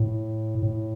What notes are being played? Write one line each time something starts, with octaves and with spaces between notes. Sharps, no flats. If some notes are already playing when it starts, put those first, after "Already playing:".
Already playing: A2
A2